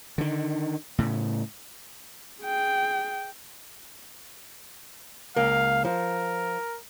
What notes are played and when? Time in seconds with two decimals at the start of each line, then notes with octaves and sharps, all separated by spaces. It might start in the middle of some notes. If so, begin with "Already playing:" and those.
0.18 D3 D#3
0.98 A2 C#3
2.41 G#4 G5
5.36 C#2 A#3 F5
5.85 F3 A#4